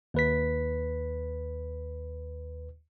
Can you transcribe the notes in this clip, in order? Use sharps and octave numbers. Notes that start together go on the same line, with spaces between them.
D#2 B4 B6